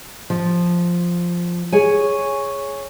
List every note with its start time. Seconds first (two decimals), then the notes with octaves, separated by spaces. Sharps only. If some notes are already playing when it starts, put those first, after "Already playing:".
0.30 F3
1.72 G#4 C#5 G#5